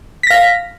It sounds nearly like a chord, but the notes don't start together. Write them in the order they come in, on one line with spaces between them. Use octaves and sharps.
B6 A#6 F5